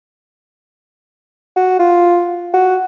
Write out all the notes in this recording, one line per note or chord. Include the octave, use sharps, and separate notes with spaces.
F#4
F4
F#4